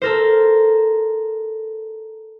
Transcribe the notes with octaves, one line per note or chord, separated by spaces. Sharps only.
A4 A#4 C5